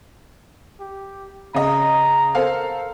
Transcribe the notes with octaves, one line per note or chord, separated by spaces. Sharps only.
G4
C#3 D#5 A#5
A4 A#4 C5 F5